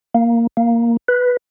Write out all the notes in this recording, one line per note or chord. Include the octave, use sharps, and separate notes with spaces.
A#3
A#3
B4